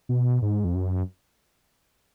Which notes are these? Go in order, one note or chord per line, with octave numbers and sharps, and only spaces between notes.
B2
G#2
F2
F#2